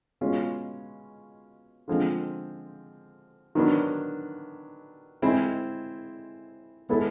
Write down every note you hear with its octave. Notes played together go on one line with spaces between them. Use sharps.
B2 G#3 C#4 F4
D3 F3 G#3 C4
D#3 F#3 B3 D4
G#3 C4 E4 G#4
G#3 B3 E4 A4